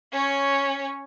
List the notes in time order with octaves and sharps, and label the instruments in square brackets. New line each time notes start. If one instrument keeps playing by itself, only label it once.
[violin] C#4 C#5